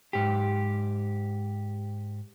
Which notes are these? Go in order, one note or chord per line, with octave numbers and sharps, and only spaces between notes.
G#2 G4